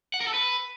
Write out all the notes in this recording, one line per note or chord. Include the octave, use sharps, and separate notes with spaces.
F#5
A#4
A4
B4